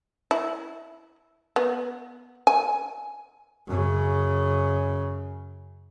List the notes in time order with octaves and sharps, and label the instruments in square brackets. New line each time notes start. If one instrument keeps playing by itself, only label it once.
[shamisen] E4
B3
G#5
[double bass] F#2 C#3